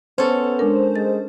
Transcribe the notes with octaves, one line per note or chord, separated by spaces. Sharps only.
B3 C#4 A4 C5
G#3 D4 A#4
G#3 A6